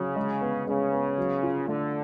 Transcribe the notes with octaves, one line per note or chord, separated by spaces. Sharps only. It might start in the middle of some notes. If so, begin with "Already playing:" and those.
Already playing: C#3 F#3
G#3
B3
C#3 G#3
B3
F#3
F4
D3 A3